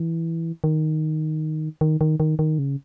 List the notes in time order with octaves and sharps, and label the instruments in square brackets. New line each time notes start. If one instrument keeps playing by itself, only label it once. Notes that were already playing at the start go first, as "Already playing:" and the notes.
Already playing: [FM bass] E3
D#3
D#3
D#3
D#3
D#3
C#3